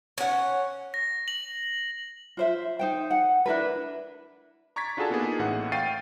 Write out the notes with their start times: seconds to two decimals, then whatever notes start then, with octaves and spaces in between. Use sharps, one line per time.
0.18 C#4 F#5
0.94 A#6
1.28 F#7
2.37 F4 C5 E5
2.79 D#4 C5 G5
3.11 F#5
3.46 D4 E4 A#4 B4
4.76 A#5 C#6 D6 G#6 A6 B6
4.97 D4 F4 F#4 G#4 A4 A5
5.10 A#3 B3 D#4 F4 G#4
5.39 A1 A2 F#5
5.72 F5 G5 C#6 A6 C7 D#7